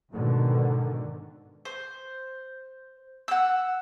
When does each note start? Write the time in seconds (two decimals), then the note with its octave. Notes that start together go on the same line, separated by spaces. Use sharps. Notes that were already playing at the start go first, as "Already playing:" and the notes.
0.11 G#2 B2 D3 D#3
1.65 C5
3.28 F#5 E6